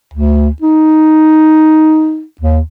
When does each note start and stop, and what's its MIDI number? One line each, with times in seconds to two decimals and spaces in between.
0.14 0.48 38
0.62 2.24 63
2.41 2.59 39